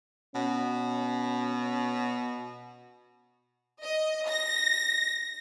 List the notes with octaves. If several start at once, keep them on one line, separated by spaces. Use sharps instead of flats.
B2 C#4
D#5
A#6